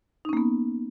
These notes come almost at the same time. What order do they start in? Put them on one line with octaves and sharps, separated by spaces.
D#4 C#4 A#3 B3